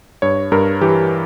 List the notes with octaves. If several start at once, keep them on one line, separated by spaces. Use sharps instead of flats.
G2 C#5
G2 A#4
E3 G4